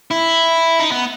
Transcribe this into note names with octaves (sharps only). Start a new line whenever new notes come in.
E4
D#4
B3